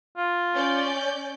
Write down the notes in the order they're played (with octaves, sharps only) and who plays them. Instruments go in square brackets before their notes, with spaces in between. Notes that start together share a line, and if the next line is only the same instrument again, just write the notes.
[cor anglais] F4
[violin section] C#4 D5 G6